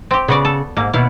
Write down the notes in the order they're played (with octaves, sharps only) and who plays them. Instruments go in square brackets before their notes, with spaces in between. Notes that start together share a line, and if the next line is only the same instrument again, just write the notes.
[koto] C4 G4
[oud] C#3 [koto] B3 F#4 D5
[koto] A4
[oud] G#2 [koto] A#3
[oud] D#2 B2 [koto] E4 F5